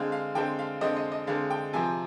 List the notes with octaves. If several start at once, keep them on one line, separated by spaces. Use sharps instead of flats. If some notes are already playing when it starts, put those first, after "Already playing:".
Already playing: D3 G#3 C4 F5
F5
D3 G#3 C4 G5
F5
D3 G#3 C4 D#5
D#5
D#5
D3 G#3 C4 F5
G5
C3 F3 C4 G#5